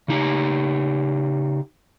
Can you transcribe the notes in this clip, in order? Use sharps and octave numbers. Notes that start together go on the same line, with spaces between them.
C#3 D#4 G4